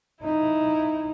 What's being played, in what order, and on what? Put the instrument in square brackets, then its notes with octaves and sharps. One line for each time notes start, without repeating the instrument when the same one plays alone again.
[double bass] D#4 [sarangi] E4